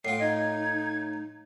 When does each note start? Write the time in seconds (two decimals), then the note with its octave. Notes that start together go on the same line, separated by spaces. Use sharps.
0.05 A2 F4 F#5 G5 C7
0.20 D#4 D#5 G#6